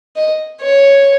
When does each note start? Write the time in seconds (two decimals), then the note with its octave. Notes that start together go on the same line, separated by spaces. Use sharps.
0.16 D#5
0.61 C#5